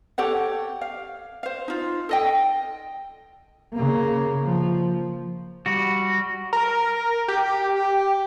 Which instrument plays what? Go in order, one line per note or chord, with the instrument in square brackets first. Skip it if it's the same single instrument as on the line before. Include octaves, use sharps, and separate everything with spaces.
[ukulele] G4 A4 C#5 F#5
F5
C5 F5
D#4 F4
A4 D#5 G5
[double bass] C#3 A#3
F3
[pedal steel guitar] G3 F#4
[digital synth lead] A#4
G4